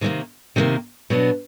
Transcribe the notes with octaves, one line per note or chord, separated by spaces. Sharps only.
C3 D#3 G3 A#3
C3 D#3 G3 A#3
B2 F#3 B3 D4